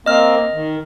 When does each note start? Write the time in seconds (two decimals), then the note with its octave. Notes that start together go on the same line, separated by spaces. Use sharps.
0.06 A#3 C4 D#5 F6
0.54 D#3